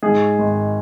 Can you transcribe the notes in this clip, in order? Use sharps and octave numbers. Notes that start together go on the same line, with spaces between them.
G#2 G#4
G#1